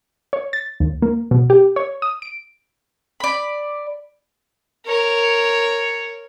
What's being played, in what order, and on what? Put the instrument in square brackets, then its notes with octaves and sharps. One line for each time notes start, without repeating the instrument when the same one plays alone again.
[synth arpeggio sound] C#5
A6
D#2
A#3
B2
G4
C#5
D#6
D7
[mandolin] D5 B5
[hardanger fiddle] A#4 C#5